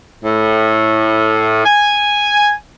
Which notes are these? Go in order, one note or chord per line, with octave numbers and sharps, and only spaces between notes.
A2
G#5